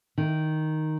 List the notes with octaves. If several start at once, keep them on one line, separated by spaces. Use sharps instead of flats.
D#3